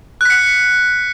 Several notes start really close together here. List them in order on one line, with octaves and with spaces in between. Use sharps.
F#6 B6 C#7